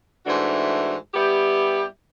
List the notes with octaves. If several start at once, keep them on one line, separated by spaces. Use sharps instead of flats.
G#2 E3 A3 D4 F#4
G3 B3 E4 G4